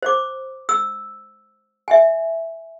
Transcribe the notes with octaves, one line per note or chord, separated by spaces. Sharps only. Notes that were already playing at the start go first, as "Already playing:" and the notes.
C5 D6
E6
E5 G#5